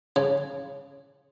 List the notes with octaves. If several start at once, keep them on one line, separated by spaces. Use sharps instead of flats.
C#3